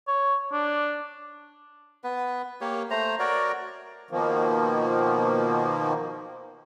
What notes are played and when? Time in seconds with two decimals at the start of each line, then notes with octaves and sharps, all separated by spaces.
0.08 C#5
0.52 D4
2.04 B3 B4
2.61 A#3 G4 C#5
2.90 A3 C5 A#5
3.19 F#4 A#4 C#5 D5
4.11 B2 D#3 F3 A#3